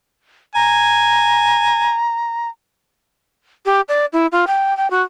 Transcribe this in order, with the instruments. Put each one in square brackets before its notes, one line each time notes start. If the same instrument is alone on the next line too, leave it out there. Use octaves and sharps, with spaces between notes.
[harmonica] G#5 [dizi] A#5
[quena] G4
D5
E4
F4
G5
G5
F#4